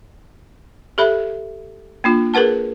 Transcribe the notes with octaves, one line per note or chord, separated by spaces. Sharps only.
G4 A4 E5 B5
A#3 D4 F4
G#4 A#4 B4 F#5 A5